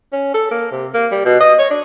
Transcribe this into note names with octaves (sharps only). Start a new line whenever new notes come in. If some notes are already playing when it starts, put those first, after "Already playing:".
C#4
A4
A#3
C3
A#3
G3
B2
D#5
C#5
D4